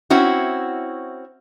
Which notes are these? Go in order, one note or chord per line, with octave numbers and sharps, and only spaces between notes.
C4 C#4 E4 F#4